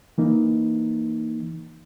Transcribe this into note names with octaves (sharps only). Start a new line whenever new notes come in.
E3 A#3 D#4